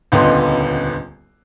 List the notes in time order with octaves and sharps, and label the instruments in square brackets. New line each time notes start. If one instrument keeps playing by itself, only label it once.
[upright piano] D#1 C#2 D3 B3 D#5 C6